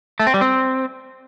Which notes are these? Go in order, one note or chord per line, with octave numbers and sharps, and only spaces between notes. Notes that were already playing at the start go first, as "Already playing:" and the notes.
A3
C4
G3
C4